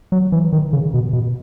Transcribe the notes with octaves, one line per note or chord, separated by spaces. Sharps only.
F#3
E3
D#3
C#3
B2
B2